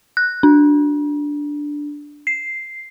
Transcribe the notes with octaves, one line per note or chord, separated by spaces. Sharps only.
F#6
D4
C7